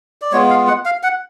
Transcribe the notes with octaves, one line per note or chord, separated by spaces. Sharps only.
D5
G#3 B3 F4 C#5
F5
F#5
F5
F#5